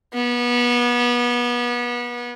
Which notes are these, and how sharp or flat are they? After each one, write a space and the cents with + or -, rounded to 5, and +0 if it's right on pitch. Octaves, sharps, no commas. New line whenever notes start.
B3 -30